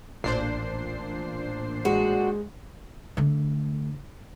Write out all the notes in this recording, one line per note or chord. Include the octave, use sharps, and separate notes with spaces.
A1 A#2 D4 C5 C7
G#3 F#4
D3 A3